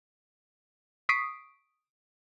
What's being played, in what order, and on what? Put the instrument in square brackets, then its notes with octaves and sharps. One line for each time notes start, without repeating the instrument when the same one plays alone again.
[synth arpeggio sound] C#6 D#6 B6 C7 D7